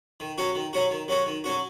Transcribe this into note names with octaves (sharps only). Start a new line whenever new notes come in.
D#3
F#3 C#4 F#4
D#3
F#3 C#4 F#4
D#3
F#3 C#4 F#4
D#3
F#3 C#4 F#4